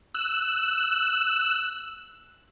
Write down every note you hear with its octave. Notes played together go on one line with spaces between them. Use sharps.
E6 F#6